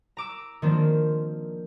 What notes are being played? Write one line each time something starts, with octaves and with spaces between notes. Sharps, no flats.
A#5 D6 E6
D#3 F3 A#3 C4 D4